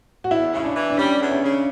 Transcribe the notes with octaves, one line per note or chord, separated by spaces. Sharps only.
F#4
E2 E4
C#3 E4
D4
E3
D4
G3 C#4
E2
C#4
C#3